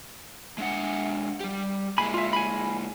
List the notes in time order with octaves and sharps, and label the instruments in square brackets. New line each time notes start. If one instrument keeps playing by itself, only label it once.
[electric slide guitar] G#3 D4 F#5
G3 G4
[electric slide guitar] A#2 G#3 [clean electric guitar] G#5 B5
[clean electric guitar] F4 E5
G#5 B5